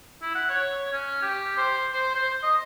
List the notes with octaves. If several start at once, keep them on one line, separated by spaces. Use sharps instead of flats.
E4
F#5
C#5
C#4
G4
C5
C5
C5
D#5